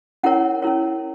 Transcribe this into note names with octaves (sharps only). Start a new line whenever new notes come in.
C#4 E4 A#4 C#5 F#5
C#4 E4 A#4 C#5